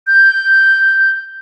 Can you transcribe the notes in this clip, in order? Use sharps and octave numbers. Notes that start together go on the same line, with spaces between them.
G6